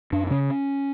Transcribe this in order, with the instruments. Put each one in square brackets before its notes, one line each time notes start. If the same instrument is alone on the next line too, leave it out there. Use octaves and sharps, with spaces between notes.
[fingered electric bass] F#2 D4
D4
C#3 C#4